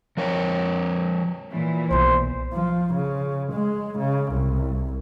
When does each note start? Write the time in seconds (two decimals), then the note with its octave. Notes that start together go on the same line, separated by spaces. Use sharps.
0.17 F3 A#4 C#5 G5
1.51 A#2 E3
1.91 B1 D#3 C5
2.53 F3
2.94 C#3
3.53 G#3
3.99 C#3
4.32 C2